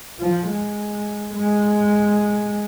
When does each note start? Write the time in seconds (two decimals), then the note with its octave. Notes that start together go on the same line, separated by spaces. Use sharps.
0.20 F3
0.48 G#3
1.34 G#3